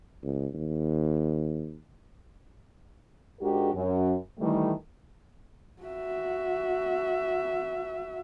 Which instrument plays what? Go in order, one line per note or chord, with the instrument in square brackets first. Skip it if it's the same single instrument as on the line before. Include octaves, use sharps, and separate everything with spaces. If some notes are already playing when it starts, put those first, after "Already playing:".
[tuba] C#2
D#2
[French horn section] G#2 G#3 D4 F#4 G4 A#4
F#2
D#3 E3 G3 A3
[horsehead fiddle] F#4 E5